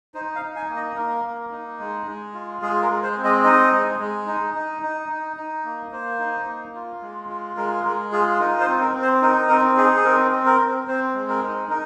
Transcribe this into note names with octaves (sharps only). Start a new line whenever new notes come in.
D#4 C5
F5
D#4
G#5
A#3
D#5
A#3 A#4
A#3
D#4
G#3
G#3
F4
G#3 G#4
A#4
G#3
C5
C4
D#5
D#4 D#5
G#3
G#3
D#4
D#4
D#4
D#4
D#4
A#3
A#3 C5
D#4
A#3
F4
G#3
F4
G#3 A#4
G#3 A#4
F4 G#4
D#4 A#4
C5
C4
A#4
C4
C5
D#4 A#4
C4 A#4
D#4 G#4
G#4
C4 A#4
C4
A#4
C4
C4 C5
G#3
A#4
D#4
D#4 A#4